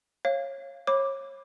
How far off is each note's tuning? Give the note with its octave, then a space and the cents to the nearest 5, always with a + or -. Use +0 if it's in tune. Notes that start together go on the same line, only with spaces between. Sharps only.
C#5 -20 F5 -15
C#5 -30 B5 +0 D6 +0